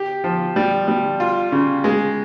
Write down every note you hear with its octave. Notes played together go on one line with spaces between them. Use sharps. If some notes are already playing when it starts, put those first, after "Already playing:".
Already playing: G4
F3
G3
G3
F4
C#3
G#3